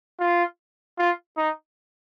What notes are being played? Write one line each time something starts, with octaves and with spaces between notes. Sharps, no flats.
F4
F4
D#4